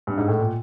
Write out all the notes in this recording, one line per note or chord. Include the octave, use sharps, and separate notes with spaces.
G2
G#2
A2
A#2